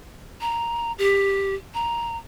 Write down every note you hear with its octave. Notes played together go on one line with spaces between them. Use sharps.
A#5
G4
A#5